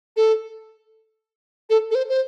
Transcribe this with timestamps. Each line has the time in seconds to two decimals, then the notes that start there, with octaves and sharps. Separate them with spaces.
0.17 A4
1.70 A4
1.91 A4
1.95 C5
2.09 C5